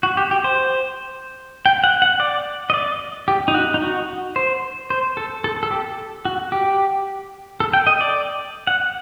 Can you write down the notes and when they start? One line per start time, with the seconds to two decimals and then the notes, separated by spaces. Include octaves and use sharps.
0.03 F#4
0.17 G4
0.31 G4
0.44 C5
1.66 G5
1.84 F#5
2.02 F#5
2.20 D5
2.70 D#5
2.74 D5
3.28 G4
3.48 D#4
3.54 F#4
3.74 D#4
3.82 F#4
4.36 C5
4.90 C5
5.17 A4
5.44 A4
5.63 A4
5.71 G4
6.25 F#4
6.52 G4
7.60 A4
7.73 G5
7.87 D#5
8.01 D5
8.67 F#5